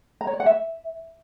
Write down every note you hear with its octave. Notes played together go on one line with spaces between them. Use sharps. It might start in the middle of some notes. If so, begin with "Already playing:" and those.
A#5
C#5
D5
F#5
E5